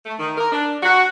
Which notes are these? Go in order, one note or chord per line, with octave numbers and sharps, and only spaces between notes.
A3
D#3
A#4
D4
F#4